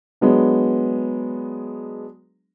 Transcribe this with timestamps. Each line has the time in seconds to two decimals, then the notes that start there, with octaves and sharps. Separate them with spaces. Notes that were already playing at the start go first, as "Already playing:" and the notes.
0.21 F#3 G#3 B3 D4